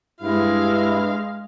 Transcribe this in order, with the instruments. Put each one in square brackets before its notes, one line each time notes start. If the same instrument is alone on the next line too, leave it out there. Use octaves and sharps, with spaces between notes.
[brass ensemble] G2 E4 [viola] G#3 F5